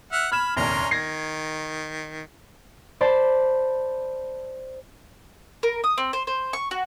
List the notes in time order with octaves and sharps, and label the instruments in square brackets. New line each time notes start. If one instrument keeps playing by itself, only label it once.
[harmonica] E5 F#5 F6
[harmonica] B5 [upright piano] F6 G#6 E7
[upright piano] F1 A#1 D#2 [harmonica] C#4 A#5 C6
[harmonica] D#3 [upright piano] G#6 A#6 C7
[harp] C5 D5 A5 B5
[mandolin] A#4
D#6
C4
C5
C5
C#6
F#4